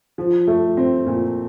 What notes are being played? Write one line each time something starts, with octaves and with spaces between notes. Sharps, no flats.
F3
A3
C4
A#2